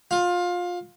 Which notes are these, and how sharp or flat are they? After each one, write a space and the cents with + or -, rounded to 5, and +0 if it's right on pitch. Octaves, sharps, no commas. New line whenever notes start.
F4 +20